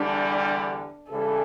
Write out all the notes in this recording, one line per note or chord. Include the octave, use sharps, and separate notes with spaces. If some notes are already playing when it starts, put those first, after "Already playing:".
Already playing: E2 D3 G3 D4
C#3 E3 G3 D4 A4